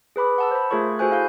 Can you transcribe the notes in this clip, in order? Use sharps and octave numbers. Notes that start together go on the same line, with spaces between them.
G#4 B4 B5 D6
F#5 A5 E6
C5 B5
A3 F4 G#4 A#4 C#5 C#6
F#4 G#4 A4 C5 G#5 F#6
E4 F5 G6